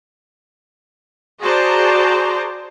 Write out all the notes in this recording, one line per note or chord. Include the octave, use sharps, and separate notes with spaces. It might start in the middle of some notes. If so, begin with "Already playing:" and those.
F#4 G#4 C5 D5 A5 A#5